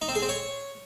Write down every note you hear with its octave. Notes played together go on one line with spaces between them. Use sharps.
D#4
C4
G#4
C4
C#5